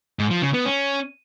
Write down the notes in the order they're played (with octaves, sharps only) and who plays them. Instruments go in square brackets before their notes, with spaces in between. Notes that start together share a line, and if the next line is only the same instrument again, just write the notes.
[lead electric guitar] G#2
F3
C#3
B3
C#4